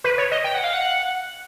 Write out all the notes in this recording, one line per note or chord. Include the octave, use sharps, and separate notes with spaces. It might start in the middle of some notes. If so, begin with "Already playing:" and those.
B4
C#5
D#5
G5
F#5
F5
F#5